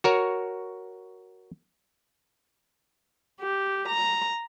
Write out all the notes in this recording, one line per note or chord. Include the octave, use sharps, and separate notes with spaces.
F#4 A#4 C#5
G4
A#5